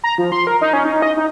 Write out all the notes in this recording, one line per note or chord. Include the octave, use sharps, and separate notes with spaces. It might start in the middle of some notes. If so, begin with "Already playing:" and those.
A#5
F3
C6
A#4
D#4
C#4
D#4
D#5
D#4